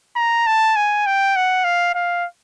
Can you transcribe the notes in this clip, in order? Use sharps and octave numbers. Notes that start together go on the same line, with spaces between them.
A#5
A5
G#5
G5
F#5
F5
F5